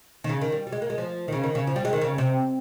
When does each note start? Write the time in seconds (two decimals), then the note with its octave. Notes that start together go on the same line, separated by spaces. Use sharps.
0.24 D#3
0.29 C#3
0.41 D#3
0.52 G3
0.67 G3
0.72 G#3
0.82 A#3
0.90 G#3
0.98 F3
1.28 D#3
1.32 C#3
1.44 D#3
1.55 C#3
1.67 F3
1.76 G3
1.85 G#3
1.93 D#3
2.01 C#3
2.18 C3